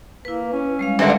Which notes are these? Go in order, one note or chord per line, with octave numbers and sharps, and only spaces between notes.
A#3 E4 B4
C#4
G3 G#3 F5
G2 A#2 D3 E5 G#5 C#6